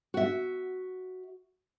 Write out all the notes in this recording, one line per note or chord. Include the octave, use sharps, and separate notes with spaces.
F#4 E5